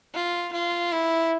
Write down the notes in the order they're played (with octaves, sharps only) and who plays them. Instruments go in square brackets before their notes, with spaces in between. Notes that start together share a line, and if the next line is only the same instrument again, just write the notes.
[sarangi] F4
F4
E4